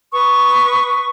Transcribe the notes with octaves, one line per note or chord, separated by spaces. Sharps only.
B4 C#6 D#6